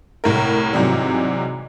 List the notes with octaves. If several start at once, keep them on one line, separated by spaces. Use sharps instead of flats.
C2 A2 A#4
G#2 C3 E3 F#3 G3